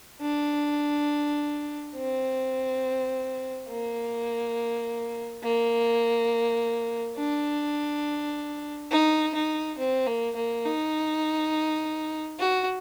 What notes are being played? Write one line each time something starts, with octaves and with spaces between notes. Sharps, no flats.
D4
C4
A#3
A#3
D4
D#4
D#4
C4
A#3
A#3
D#4
F#4